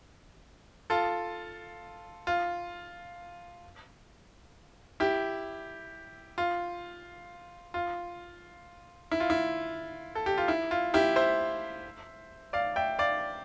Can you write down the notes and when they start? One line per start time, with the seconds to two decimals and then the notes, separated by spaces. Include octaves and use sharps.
0.90 F4 A4
2.27 F4
5.00 E4 G4
6.38 F4
7.74 F4
9.12 E4
9.20 F4
9.30 E4
10.15 A4
10.26 G4
10.38 F4
10.48 E4
10.71 F4
10.94 E4 G4
11.16 C5 E5
12.53 D5 F5
12.76 E5 G5
12.99 D5 F5